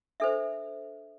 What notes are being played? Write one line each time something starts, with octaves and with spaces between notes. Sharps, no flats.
D4 A4 C5 E5